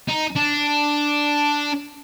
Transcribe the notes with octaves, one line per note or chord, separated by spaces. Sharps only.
D#4
D4